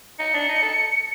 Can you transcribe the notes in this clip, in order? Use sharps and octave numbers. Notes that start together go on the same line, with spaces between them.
D#4 C#7
D4
D#4
A4